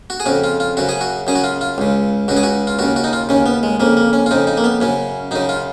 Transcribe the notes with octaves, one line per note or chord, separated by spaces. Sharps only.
F#4
G#4
F2 C#3 F#4
F4
F4
F#2 C#3 F#4
G#4
F#4
F#2 C#3 G#4
F#4
F4
F4
C#2 C#3
C#2 C#3 F#4
G#4
F#4
F4
D#2 C#3 F#4
F#4
D#4
F4
D#2 C#3 C#4
B3
G#3
F2 C#3 A#3
A#3
C#4
F4
F2 C#3 D#4
D#4
A#3
B3
F#2 C#3 C#4
F#2 C#3 D#4
F4